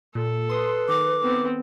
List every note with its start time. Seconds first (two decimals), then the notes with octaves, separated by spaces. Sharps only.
0.15 A#2 A4
0.49 B4 C6 D#6
0.89 D#3 D6
1.22 B3 C4